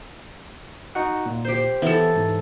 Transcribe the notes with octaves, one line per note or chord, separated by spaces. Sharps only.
D#4 F#4 F#5
A#2
G4 C5
E3 B3 A4
G#2